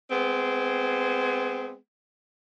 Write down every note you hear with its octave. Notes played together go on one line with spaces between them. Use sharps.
G#3 B3 C4